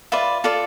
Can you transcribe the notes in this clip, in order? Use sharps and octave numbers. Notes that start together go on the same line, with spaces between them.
F4 B4 D5 E5
F4 A4 D5